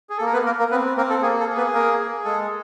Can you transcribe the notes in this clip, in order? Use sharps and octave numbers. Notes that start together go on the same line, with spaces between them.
G#4
A4
A#3 A#4
B3 B4
A#3 A#4
A#3 A#4
B3 C4 B4
A#3 C4 A#4
A4
A#3 G#4
A4
G#4
B3 B4
A#3 A#4
G#4
G#3 A4